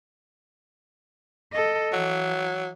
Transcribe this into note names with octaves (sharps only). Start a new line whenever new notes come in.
A4 D#5
E3 F#3